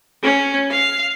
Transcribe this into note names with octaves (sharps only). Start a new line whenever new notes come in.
C#4
F5